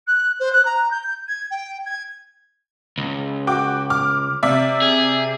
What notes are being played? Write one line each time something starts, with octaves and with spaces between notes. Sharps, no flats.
F#6
C5
F#6
A#5
G6
G#6
G5
G#6
C#2
F#4 G5 D6
D6 F6
C3 D5 E5
G#4